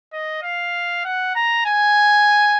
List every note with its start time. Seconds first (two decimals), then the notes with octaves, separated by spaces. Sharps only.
0.13 D#5
0.43 F5
1.05 F#5
1.36 A#5
1.66 G#5